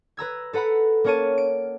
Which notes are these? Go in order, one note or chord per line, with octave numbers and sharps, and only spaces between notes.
B4 A#5 E6 G#6
A4 B4 F#5 A#5 B5
A#3 C#4 A#4 C#5 A5 D#7
D7